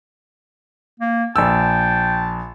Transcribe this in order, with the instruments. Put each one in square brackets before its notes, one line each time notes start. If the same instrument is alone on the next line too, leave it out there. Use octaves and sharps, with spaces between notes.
[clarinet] A#3
[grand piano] A#1 E6 [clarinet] G5 [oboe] A5